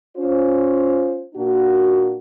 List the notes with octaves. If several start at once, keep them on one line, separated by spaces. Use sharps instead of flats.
C#4 F4 C5
A#2 A#3 D4 F#4